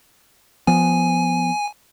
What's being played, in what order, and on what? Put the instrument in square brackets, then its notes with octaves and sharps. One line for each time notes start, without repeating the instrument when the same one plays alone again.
[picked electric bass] F3 B3 [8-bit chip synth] G#5